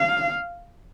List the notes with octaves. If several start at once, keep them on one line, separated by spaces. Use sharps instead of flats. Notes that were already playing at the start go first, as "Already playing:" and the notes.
Already playing: F5